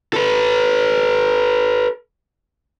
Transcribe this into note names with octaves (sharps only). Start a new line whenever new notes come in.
A4 B4